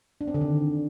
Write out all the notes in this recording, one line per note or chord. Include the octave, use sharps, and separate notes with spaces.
D4
C4
D3
D#3